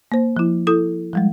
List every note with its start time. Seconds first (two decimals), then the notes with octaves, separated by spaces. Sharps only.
0.12 A#3 C5
0.37 F3 E4
0.67 E4 A4 D#6
1.13 F3 G3 G#3